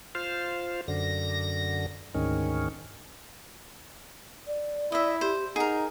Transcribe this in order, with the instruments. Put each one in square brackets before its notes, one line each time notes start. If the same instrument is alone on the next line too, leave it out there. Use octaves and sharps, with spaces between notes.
[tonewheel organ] F4 C5 F5
F#2 D3 A#6
D2 G#2 D#3 C#4
[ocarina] D5
[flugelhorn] E4 [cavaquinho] D#5 E5
[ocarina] G4 [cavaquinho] C5
[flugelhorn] D#4 [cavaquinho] G#4 A#4 [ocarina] F#5